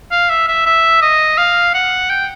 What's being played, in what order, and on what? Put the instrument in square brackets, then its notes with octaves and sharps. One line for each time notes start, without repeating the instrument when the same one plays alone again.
[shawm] F5
E5
E5
E5
D#5
F5
F#5
G5